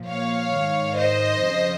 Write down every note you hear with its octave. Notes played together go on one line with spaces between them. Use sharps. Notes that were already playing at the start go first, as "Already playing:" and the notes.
Already playing: A#2 F3
C#5 F5
G#2 D#3
C5 D#5
F2 C#3 F3